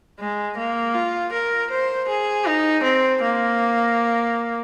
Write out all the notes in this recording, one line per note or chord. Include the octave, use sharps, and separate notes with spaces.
G#3
A#3
F4
A#4
C5
G#4
D#4
C4
A#3